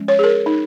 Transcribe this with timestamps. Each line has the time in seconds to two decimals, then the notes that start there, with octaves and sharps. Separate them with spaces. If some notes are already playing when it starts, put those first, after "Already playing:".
Already playing: F3 G#3 C#4
0.08 C#5
0.19 G#4
0.24 A#4
0.46 D#4